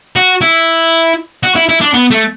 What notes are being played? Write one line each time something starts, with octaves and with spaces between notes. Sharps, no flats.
F#4
E4
F#4
E4
E4
D4
B3
A3